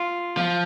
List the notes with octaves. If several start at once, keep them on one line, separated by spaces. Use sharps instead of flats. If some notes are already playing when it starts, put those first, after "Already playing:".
Already playing: F4
F3